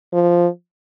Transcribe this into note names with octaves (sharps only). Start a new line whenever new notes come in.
F3